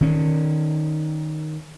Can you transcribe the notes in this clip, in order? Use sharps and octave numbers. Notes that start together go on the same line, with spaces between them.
D#3 C#4